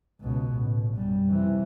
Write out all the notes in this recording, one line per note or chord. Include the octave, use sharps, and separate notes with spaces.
C#2 B2
A1
F#2 G3
C3 E3